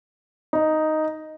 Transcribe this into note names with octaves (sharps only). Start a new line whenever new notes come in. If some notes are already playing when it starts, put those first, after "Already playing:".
D#4